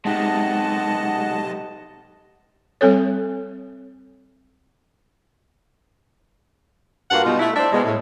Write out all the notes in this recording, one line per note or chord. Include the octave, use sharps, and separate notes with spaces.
B1 C3 G#3 D#4 D#5 F#5 A5
G3 C4 A4 C#5
G2 A#3 F4 F#4 F#5
B2 G3 G#3 D#4 F4
A3 E4
D4 C5 D5 E5
B2 G#3
A2